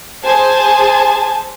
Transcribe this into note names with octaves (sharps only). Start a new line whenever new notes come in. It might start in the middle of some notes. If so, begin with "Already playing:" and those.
G#4 C5 G#5 A5